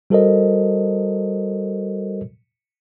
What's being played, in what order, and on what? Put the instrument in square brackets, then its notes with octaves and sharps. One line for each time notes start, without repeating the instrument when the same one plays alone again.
[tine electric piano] G3 F#4 A4 A#4 C5 D#5